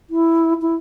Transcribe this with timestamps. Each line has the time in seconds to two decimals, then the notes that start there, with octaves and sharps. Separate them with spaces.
0.10 E4
0.62 E4